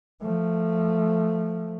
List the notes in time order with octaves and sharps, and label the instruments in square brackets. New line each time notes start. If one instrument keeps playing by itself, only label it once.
[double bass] F3 A3